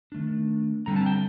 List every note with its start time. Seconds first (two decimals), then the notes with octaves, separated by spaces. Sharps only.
0.12 D#3 A3 D4
0.86 D3 G3 C4 A#5
0.96 A5
1.06 G5